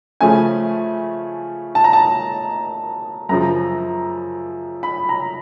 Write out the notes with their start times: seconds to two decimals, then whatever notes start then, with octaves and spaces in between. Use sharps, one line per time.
0.21 C#3 F3 A3 C#4 G#5
1.75 A5
1.84 A#5
1.93 A5
3.29 F#2 C#3 F3 A#5
4.83 B5
5.09 A#5